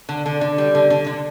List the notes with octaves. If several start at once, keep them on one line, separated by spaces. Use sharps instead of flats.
D3
D3
D3
G3
D3
D3
D3